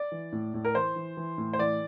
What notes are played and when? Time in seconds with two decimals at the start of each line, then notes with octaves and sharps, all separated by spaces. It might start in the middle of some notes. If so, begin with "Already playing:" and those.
Already playing: D5
0.12 E3
0.32 A2
0.54 A2
0.65 A#4
0.75 E3 C5
0.96 E3
1.17 E3
1.38 A2
1.53 C5
1.59 E3 D5